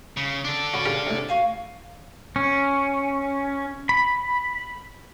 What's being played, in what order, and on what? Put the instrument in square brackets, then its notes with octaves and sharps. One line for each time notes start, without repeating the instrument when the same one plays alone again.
[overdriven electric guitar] C#3
D4 A4
[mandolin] C#4 A5 B5 [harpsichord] F#4
[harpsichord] C#3 G4 A#4 [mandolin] F6
[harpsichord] A2 C3
[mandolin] F#4 F5 G#5
[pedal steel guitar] C#4
B5